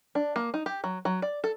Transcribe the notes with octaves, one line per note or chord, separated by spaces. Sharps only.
D4
A#3
D#4
G4
F#3
F#3
D5
A4